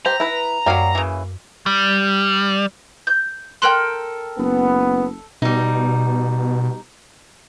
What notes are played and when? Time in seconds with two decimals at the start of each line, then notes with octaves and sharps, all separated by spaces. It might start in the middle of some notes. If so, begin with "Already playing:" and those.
0.06 G4 C5 A#5
0.20 E4 B4
0.66 F#2 F#3 G3 A#3 F5
0.95 C#3 E3
1.66 G3
3.07 G6
3.62 A4 A#4 G5 C6 F#6 F#7
4.38 F#1 B3
5.42 B2 G3 D#4